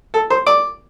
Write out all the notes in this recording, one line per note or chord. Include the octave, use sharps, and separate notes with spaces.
A4
C5
D5